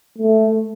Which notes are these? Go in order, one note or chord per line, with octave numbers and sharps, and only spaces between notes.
A3